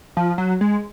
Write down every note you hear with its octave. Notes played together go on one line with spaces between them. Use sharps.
F3
F#3
G#3